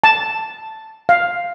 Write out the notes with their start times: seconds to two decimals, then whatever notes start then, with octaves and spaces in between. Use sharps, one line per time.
0.04 A5
1.09 F5